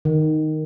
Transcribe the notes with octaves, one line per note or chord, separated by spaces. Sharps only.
D#3